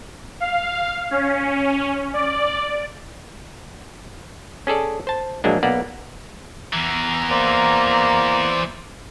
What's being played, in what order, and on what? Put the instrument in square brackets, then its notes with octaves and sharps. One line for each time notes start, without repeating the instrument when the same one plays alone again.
[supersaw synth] F5
C#4
D5
[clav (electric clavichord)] C#4 G#4 A4 D5
C5 A5
A#1 F#3 G#3 A#3 D4
B1 A#3 B3 D5 F#5
[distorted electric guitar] E2 E3 [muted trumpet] A#5
[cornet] A#3 [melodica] C5 D5